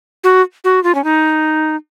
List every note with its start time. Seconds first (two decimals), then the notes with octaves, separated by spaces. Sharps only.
0.24 F#4
0.64 F#4
0.84 F4
0.95 C#4
1.04 D#4